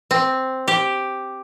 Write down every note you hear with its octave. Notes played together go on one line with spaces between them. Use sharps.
C4
G4